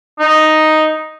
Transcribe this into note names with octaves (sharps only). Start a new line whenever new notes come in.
D#4